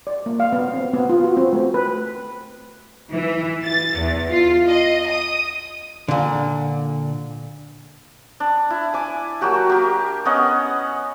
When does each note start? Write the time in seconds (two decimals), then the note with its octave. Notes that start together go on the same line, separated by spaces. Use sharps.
0.07 D5
0.26 A#3
0.40 F5
0.53 B3
0.74 C4
0.93 B3
1.10 F4
1.24 F#4
1.37 C4
1.53 A3
1.74 B4
3.12 E3
3.63 A6
3.98 E2
4.30 F4
4.67 D#5
5.07 D#6
6.08 A#2 D3
8.40 D4
8.70 E4
8.94 G#5 D6
9.41 F#3 A#3 F#4 G4
9.69 A#3 G4
10.25 B3 C#4 D#5 F#5